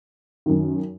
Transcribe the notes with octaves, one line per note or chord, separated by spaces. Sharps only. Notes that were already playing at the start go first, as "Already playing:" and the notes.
F#2 D#3